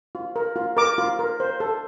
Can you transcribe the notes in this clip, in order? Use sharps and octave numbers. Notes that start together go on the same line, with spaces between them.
F4
A#4
F4
A#4 D6
F4
A#4
C5
A4